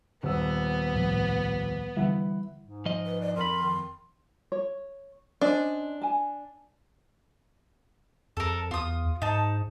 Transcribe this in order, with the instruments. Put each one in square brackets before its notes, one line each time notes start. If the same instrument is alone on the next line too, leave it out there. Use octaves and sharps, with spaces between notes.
[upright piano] D#1 E6 [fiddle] B3
[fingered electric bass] C2 A2 F3
[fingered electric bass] D3 E3 G3 [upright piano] E4 F#5
[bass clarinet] G#2
[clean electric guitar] F3 D#5
[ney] B4
D5
[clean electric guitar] F2 B5 [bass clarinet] A#4 [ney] C6
[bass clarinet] D#3
[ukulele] C#5
[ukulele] C#4 C5 D#5 [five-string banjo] D4
[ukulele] G#5 A5
[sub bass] F2 [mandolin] A4 A#4
[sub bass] E2 [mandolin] F4 D#6
[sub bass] G#2 [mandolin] D#4 A5